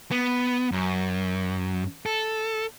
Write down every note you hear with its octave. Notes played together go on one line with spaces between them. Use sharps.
B3
F#2
A4